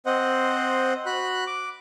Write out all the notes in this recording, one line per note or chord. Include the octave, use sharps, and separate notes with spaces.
C4 C5 D#5 F#5
F#4 B5 F#6
D6